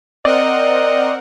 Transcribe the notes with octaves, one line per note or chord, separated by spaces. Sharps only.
C4 A#4 D5 D#5 F#5